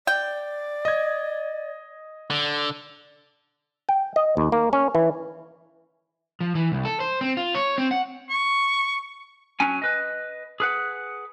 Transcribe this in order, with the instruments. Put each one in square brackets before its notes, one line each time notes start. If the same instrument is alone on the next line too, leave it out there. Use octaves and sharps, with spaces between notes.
[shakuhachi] D5 [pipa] G5
[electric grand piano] D#5 G#6
[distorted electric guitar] D3
[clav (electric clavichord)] G5
D#5
D#2
A#3
C#4
E3
[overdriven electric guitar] F3
E3
C2
A4
C5
C4
F4
C#5
C4
F#5
[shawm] C#6
[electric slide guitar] F#3 C#4 G#5
B4 D#5
G#4 B4 F#5